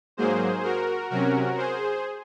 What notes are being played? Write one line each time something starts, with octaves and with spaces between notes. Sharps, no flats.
G#2 F#3 A#3 G#4 C5
F#4 A#4
C3 F#3 C#4 F#4 A#4
G#4 C5